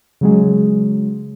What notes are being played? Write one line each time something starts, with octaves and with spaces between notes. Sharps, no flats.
C#3 F#3 G#3